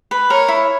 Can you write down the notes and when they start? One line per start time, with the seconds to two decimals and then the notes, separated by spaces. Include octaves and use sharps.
0.11 B4
0.30 A#4 C#5
0.48 E4